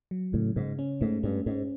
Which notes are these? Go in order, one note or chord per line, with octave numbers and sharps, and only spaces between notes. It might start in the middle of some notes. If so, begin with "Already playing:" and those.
F#3
A2 C#3
G#2 C#3
C#4
G#2 A3
G2 C#4
G#2 C#4